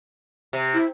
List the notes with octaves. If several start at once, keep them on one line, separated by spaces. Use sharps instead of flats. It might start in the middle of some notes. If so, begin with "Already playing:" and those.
C3
E4